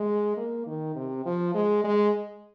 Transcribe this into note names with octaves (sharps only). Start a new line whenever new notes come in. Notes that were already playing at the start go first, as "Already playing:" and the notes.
Already playing: G#3
A#3
D#3
C3
F3
G#3
G#3